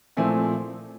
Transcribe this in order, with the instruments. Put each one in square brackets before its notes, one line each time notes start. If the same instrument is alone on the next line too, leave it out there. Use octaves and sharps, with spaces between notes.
[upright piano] A#2 F3 A3 C4 E4 G#5